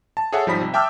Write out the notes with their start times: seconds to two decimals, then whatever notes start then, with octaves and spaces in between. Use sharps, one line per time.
0.17 A5
0.32 G#4 A4 C#5 E5 F#5 A5
0.46 G#1 F3 G3 D#4 B5 B6
0.61 C3
0.74 E5 G5 A5 D6 E6 F6